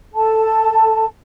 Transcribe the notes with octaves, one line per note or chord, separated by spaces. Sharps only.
A4 A5